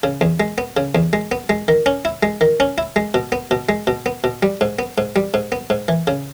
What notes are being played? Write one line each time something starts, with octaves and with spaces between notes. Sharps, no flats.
C#3
E2
G#3
B3
C#3
E2
G#3
B3
G#3
D#3
C#4
E4
G#3
D#3
C#4
E4
G#3
B2
B3
B2
G#3
B2
B3
B2
G3
G#2
B3
G#2
G3
G#2
B3
G#2
E3
C#3